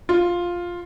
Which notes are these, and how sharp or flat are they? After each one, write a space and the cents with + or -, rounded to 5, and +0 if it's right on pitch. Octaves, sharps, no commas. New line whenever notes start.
F4 +5